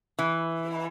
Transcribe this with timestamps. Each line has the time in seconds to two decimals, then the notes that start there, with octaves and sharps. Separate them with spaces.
0.19 E3